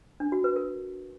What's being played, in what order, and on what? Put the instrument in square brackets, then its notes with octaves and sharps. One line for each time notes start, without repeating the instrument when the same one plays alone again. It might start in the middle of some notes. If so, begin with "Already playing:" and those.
[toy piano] D4
F#4
B4
A#4